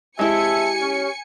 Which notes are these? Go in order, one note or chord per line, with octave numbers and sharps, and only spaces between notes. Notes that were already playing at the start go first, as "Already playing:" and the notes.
G#3 C4 E4 G4 E5 G#5 A5 C#7
C#4